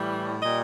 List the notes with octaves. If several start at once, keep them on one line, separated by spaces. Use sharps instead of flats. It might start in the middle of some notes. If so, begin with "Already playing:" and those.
Already playing: A2 E3 G3
A#2 G3 D#5